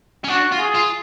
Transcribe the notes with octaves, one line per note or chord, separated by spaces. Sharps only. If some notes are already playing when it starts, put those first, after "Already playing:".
C#4
D4 F#4
F4
G#4
F4